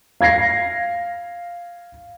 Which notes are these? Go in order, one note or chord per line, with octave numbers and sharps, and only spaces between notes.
F5 G#6 A#6 C7